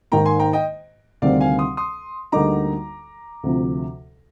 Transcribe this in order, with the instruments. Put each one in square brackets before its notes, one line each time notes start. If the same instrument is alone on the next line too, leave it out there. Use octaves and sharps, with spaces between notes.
[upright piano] G#2 D#3 A#3 [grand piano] G5 A#5
[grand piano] G#5 C6
G5 A#5
D#5 G5
[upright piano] D2 C3 D#3 G3 C4 [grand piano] D5 F5
[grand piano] F5 G#5
C6 D#6
C6 D#6
[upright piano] D2 D3 G3 A#3 D#4 [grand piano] A#5 D6
[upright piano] D2 C3 F3